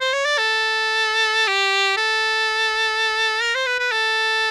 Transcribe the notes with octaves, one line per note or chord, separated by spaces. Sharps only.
C5
C#5
D5
A4
G4
A4
A#4
C5
B4
B4
A4